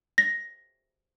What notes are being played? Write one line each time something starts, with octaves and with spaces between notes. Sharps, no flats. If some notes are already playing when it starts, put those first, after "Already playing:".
A#6